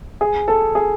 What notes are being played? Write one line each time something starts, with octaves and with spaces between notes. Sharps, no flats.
G#4
A4
G#4